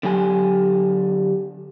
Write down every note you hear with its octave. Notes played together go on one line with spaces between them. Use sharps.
D3 F#3 G4 G#5